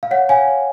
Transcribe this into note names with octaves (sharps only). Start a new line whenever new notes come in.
F5
C#5 F#5
C#5 F5 G#5
C#5